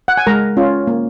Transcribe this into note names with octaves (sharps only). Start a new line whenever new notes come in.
F#5
G#5
G#3 A#4 A#5
C#4 F4
A#3